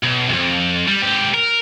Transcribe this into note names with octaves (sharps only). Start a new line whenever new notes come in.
B1
C2 F2
G3
G#2 G4
A#4